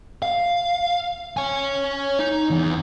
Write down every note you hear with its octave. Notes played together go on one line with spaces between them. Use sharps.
F5
C#5 G#5
D#4
E2